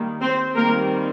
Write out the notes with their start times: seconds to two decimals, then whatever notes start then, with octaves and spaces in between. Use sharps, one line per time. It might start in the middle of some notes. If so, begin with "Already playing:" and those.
Already playing: D#3 G3 A#3
0.21 C4 C5
0.55 D#3 G3 A#3 C4 A#4